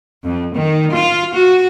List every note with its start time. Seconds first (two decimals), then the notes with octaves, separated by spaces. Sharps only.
0.24 F2
0.55 D#3
0.93 F4
1.35 F#4